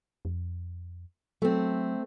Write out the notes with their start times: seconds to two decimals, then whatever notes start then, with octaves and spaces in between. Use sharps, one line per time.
0.25 F2
1.42 F#3 A3 C4